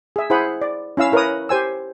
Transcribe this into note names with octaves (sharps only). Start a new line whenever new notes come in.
G#4 E5
E4 G#4 C5 F#5 B5
D5
C#4 E4 F5 E6
E4 A#4 B4 C#5 A#5 D#6
G4 C5 G#5 E6